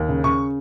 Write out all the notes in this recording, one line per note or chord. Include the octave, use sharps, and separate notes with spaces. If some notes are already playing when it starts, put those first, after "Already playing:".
Already playing: D#2
C#3
C#3 C#6